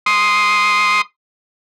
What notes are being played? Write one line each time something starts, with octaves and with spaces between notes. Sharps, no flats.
C6 D#6